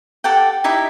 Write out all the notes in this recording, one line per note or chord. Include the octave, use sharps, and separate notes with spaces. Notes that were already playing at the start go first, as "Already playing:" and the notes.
G4 A4 F#5 G5
D#4 E4 G4 E5